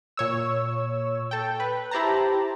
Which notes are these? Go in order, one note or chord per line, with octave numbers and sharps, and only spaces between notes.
A#2 C#5 E6
A4 G5
B4
E4 G4 C5 A5 A#5